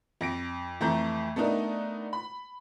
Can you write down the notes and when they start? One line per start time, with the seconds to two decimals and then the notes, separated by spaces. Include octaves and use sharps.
0.21 F2 A#6 D7
0.81 F2 E3 A3 A#5 G6
1.36 A3 B3 D4 D#4 A#4
2.13 B5